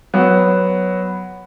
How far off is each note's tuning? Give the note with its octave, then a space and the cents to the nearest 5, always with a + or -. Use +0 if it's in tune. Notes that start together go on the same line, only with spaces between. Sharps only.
F#3 +0 B3 +0